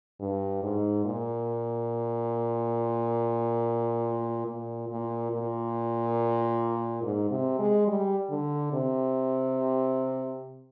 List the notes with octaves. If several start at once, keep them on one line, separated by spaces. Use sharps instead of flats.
G2
G#2
A#2
A#2
A#2
A#2
G#2
C3
G#3
G3
D3
C3